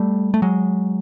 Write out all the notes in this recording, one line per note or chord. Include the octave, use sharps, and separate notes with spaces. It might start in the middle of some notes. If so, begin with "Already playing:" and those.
Already playing: G3 A3
A3
F#3 G#3